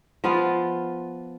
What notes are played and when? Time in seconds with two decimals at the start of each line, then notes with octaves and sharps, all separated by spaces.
0.24 F3 B3 F4